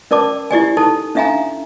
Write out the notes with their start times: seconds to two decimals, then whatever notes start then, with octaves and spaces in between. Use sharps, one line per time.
0.11 C#4 A#4 D5 A5 D6
0.51 E4 G4 D5 G#5
0.77 D#4 A4 A5
1.15 C#4 D4 E5 F5 G#5 A#5